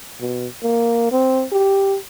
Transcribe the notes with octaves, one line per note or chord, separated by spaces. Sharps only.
B2
A#3
C4
G4